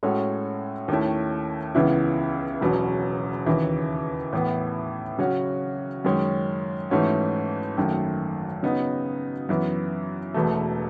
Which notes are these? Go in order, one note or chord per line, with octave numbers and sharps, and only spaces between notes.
A2 G#3 C#4 F#4 A4
D#2 D#3 A3 C#4 E4
C#2 C#3 E3 B3 E4
E1 E2 B2 F#3 C#4
D#2 C#3 E3
A2 E3 B3
C#3 F#3 C#4 F#4
F#2 D#3 G#3 C#4
G#2 E3 A3 C#4 F#4
G#1 F#2 D#3 A3
C#3 F#3 B3 D#4
F#2 E3 B3
E1 E2 B2 A3